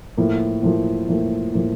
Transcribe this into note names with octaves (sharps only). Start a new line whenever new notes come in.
A2 F3 A#3
A2 F3 A#3
A2 F3 A#3
A2 F3 A#3